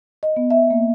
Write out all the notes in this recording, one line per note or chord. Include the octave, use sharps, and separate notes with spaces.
D#5
B3
E5
A#3